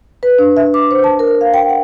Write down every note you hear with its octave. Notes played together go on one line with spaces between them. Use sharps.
B4
D4
E5
D6
C5
A5
A#4
F5
G5
F#5